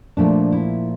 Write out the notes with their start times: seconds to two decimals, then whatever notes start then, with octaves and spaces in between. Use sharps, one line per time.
0.17 A#2 F3 A3 D4
0.52 E4